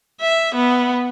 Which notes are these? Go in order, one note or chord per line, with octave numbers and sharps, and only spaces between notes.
E5
B3